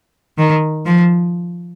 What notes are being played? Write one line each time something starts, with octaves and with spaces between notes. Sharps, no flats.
D#3
F3